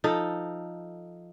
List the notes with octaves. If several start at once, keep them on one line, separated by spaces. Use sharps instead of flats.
F3 D#4 A4